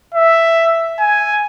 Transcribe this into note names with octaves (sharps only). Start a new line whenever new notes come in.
E5
G#5